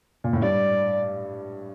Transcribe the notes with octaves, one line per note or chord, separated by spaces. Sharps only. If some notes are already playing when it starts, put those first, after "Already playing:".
A#2
A2
G2 D5